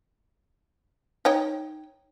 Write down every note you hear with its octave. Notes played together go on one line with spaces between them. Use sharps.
D#4 C#5 G5